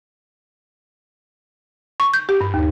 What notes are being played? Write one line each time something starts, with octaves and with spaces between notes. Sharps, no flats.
C#6
G6
G4
G2
D#2